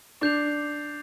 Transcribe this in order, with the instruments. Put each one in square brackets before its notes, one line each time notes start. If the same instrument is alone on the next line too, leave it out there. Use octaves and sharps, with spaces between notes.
[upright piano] D4 [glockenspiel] D6 G6 C7 F7